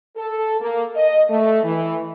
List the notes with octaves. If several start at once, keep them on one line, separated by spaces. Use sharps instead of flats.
A4
A#3
D#5
A3
E3